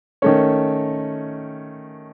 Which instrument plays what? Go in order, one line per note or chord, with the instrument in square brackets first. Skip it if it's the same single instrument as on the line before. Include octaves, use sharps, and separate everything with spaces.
[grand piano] D#3 A3 C#4 C#5